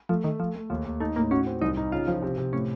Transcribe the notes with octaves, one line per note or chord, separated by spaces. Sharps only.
F3 A3
D#3 A3
F3 A3
A3
D#2 F3
D#2
A3 D#4
A2 A#3
C#4 F#4
C4
C2 D#4
D#4
C#3 F4
F3
C3
C3
A2 C#4